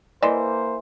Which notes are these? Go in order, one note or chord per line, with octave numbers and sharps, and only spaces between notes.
E3 A#3 C5 D5 D#5 C6